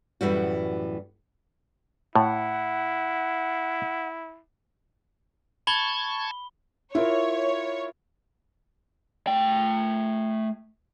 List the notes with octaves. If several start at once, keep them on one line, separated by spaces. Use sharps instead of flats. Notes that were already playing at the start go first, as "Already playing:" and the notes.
F#2 A2 E3 G3 F#4
A2 E4 F#5
A5 B5 C#6 G#6 G7
E4 F4 A#4 C#5
A3 G5